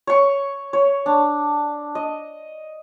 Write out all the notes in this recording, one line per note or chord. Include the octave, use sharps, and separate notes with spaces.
C#5 C#6
C#5
D4
D#5